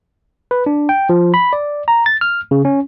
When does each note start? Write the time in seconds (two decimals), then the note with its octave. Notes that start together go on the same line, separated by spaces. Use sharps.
0.51 B4
0.66 D4
0.89 G5
1.09 F3
1.34 B5
1.53 D5
1.88 A#5
2.06 A6
2.21 F6
2.51 C#3
2.65 C#4